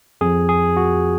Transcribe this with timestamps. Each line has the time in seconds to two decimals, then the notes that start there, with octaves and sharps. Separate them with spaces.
0.21 F2 F3 G#4
0.49 G#4
0.77 F#4